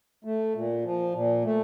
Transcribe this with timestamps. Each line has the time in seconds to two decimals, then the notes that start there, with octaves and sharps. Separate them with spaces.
0.24 A3
0.55 A#2
0.84 F3
1.14 A#2
1.45 A3